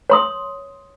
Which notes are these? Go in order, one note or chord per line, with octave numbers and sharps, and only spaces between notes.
C#5 C6 D#6